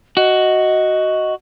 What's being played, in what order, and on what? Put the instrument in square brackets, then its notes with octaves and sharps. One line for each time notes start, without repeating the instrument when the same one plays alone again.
[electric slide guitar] F#4 [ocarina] D#5